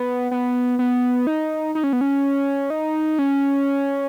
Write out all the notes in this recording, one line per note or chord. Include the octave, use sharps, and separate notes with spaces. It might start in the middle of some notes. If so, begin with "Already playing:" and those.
Already playing: B3
B3
B3
D#4
D#4
C#4
B3
C#4
D#4
C#4